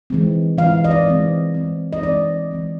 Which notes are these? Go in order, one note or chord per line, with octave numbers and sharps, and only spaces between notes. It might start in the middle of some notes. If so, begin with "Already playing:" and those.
E3 G#3 C4
E3 G#3 C4 F5
D#5
D5
E3 G#3 C4
E3 G#3 C4
D#5
E3 G#3 C4 D5
E3 G#3 C4